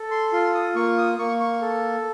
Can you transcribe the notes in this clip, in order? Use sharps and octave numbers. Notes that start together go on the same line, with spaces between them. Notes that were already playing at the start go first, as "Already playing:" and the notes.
Already playing: A4
C6
F4 C6
D#6
A#3 C#6
D#6
A#3 C#6
C#6
A4